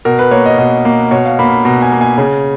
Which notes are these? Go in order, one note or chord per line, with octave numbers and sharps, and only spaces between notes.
B2 A#4
B4
A#3 C#5
D#5
B2 D#5
A#3
B2 C#5
F5
A#3 B5
B5
B2 A#5
G#5
A#3
G#5
C#3